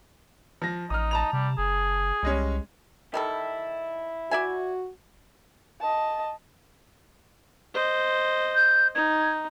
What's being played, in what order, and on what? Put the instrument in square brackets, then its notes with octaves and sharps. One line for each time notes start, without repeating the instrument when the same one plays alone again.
[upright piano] F3 A#6
[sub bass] A1 [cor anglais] D#4 [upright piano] D#6 F6
[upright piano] A5 A#5 F7
[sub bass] C3 [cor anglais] G3
[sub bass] F#1 [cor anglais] G#4
[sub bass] C2 [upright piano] G3 G#3 C#4
[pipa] D#3 G3 A4 [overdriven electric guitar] E4
[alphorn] F#4 [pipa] D5 E5 G#5
[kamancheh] D#5 A5
[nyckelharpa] C5 D#5
[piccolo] G6
[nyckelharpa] D#4 [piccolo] G#6